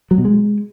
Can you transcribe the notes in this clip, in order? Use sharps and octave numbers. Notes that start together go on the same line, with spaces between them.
F#3
B2
G#3